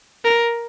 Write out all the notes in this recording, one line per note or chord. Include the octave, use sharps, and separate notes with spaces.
A#4